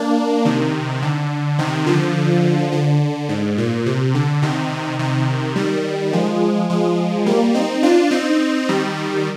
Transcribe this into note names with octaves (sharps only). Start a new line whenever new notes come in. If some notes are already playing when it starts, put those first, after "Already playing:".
Already playing: A#3 D4
C3 D#3
D3
C3 D#3
D3 F3
D3
G#2
A#2
C3
D3
C3 D#3
C3 D#3
D#3 G3
F3 G#3
F3 G#3
G3 A#3
C4 D#4
D4 F4
C4 D#4
D#3 G3